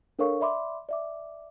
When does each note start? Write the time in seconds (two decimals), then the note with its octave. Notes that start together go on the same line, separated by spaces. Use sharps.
0.19 D4 A4 A#4 C#5 F5 C#6
0.41 D5 E5 B5 C6 D6
0.89 D5 E5 D6